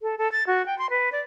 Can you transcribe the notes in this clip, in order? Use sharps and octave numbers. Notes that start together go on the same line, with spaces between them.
A4
A4
A6
F#4
G5
C6
B4
D5